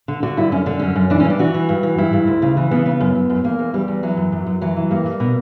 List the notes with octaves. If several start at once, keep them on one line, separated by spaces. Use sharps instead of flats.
D3
D3 F#4
G2 E4
F#2 C#4
D3 D4
F#2 C#4
F#2
E3 D4
C#4
G2
D4
E3 F#4
E3
G2
E3
G2 E4
G2
D2
C#3
E3
C#3 B3
C#3 B3
F#2
F#2
F#2
E2 A#3
E2
E2 G3
E2
E3 F#3
F#2
F#2
F#2
E3 F#3
E3
G2 A#3
G2
B2